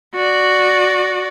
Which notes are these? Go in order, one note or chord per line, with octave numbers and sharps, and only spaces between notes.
F#4 D5